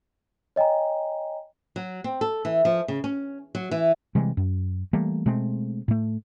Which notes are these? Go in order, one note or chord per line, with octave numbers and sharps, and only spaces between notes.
C#5 D#5 G5 G#5 A#5
F#3
C4
A4
E3
F3
C#3
C#4
F#3
E3
C3 E3 G3 G#3
F#2
E3 G3 A3 A#3
B2 G#3 A3 C4
A2 A3